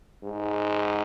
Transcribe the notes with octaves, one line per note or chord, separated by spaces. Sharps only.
G#2